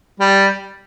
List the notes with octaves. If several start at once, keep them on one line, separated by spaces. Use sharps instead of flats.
G3